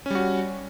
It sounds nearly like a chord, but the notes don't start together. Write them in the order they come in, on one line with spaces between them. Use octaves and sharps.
C#4 G3 F#4